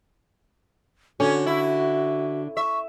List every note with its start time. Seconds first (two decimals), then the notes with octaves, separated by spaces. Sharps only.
1.20 D3 C#4 F#4
1.46 E4
2.57 E5 C#6